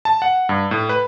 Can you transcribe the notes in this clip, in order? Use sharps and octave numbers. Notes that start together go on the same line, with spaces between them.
A5
F#5
G2
A2
B4